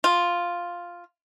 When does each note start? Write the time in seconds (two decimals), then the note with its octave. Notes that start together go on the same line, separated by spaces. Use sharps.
0.04 F4